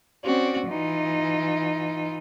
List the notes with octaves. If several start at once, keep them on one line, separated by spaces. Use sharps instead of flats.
C4 C#4 F#4 D5
E3 D#4 F4